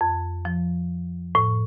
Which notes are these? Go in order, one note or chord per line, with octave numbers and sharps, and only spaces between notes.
F2
F3
A2